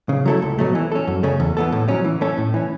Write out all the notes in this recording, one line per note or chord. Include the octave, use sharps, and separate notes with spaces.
C#3
F#3 A3 E4 A4
C#2
B2 F#3 A3
E3
C#4 A4
F#2
C#3 A3 C#4
E2
E3 B3 A4
A2
F#3 C#4
E3
A3 C#4 A4
A2
E3 C#4